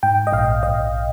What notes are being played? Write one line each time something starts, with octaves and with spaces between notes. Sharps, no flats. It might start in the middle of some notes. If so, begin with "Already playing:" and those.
G#2 G5
D#5
A#1 F5
A#1 D#5